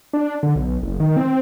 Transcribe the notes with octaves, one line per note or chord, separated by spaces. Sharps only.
D4
D3
B1
F#1
D#3
C4